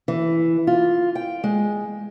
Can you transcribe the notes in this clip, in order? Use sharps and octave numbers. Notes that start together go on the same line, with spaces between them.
E3
F4
G5
G#3